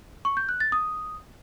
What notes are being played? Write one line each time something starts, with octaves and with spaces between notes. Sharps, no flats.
C#6
G6
F#6
A6
D#6